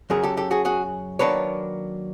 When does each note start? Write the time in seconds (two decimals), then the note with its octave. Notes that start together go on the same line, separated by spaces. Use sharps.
0.10 F#2 C#3 F#3 G#4 A#4
0.23 G4 A4
0.37 G4 A4
0.51 F#4 G#4
0.65 F#4 G#4
1.19 D#3 F#3 A#3 D4 B4 C#5